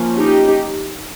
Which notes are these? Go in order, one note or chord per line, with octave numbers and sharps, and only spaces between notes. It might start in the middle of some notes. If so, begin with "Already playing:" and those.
Already playing: F3 A#3 C#4
D#4 G4